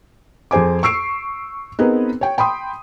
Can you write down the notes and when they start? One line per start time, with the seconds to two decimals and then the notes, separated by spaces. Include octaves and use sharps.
0.51 F2 G#4 C5 G#5 D6
0.83 C#6 E6 C7 D7
1.79 B3 C4 D#4 G#4 A#4 B4
2.21 C#5 G5
2.38 G5 B5 C6 D#6